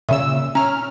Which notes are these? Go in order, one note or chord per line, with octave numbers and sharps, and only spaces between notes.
A#2 C#3 E5 E6
C#4 A#5 F6